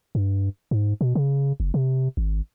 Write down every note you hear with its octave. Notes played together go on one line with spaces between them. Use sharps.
G2
G#2
B2
C#3
F#1
C3
G#1